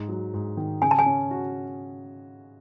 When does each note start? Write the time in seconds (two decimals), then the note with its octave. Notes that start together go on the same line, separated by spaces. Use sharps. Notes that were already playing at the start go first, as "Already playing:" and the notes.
Already playing: G#2
0.09 F#3
0.34 G#2
0.57 D#3
0.82 C#3 G#5
0.91 A5
0.99 G#5
1.06 C#4
1.31 F#4